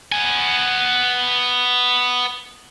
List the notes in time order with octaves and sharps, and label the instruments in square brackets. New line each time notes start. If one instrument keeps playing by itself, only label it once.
[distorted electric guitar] B3 G#5